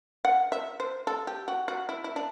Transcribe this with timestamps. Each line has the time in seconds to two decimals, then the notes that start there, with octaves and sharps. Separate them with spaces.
0.25 F#5
0.52 E5
0.80 C5
1.07 A4
1.27 G4
1.48 F#4
1.68 F#4
1.89 E4
2.04 E4
2.16 D4